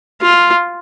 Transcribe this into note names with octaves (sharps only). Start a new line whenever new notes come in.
F4